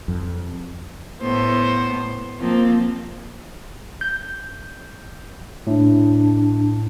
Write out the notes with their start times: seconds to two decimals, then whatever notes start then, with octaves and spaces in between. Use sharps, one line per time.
0.08 F2
1.21 A2 B3 C5
2.39 F3 A#3 C4
4.01 G6
5.67 A2 D4